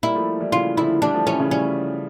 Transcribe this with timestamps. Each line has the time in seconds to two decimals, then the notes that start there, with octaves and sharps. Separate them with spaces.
0.03 G3 A#3 E4
0.15 F3 A3
0.40 E3 G3
0.52 C#3 E3 F4
0.77 D3 F3 E4
1.02 E3 G3 D4
1.14 F3 A3
1.26 E3 G3 C#4
1.39 C#3 E3
1.51 E3 G3 C#4